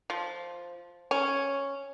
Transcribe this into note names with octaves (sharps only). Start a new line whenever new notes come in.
F3
C#4